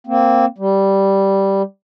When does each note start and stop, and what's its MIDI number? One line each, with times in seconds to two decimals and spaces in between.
0.07 0.45 58
0.07 0.45 60
0.58 1.62 55